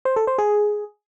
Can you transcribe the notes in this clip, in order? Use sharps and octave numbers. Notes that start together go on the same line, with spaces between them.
C5
A4
C5
G#4